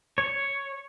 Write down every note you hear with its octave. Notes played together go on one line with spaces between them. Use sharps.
C#5